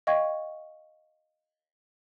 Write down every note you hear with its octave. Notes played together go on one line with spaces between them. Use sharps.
D#5 F5 G5 C#6 G#6